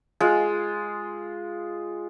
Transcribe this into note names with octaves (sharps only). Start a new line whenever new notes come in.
G#3 F4